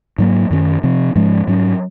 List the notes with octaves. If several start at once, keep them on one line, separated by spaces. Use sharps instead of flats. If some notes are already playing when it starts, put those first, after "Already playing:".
G#2 F#3 A#3
F#2 D#3 A#3 C#4
C3 F3 C4
G#2 F3 G#3 C#4
G#2 F#3 C#4